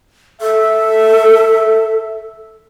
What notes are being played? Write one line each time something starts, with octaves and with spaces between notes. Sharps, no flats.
A4 E5